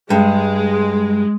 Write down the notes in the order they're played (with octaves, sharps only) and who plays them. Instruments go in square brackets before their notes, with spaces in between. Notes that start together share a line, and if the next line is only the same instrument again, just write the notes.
[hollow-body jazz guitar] G2 [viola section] G#3